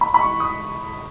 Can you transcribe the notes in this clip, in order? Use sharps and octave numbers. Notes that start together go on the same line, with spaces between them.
B5
B5
C#6
D#6